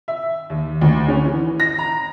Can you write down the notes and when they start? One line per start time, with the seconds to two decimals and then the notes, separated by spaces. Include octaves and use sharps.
0.08 E5
0.50 D#2
0.81 D2
1.08 C#4
1.25 E3
1.60 A#6
1.79 A#5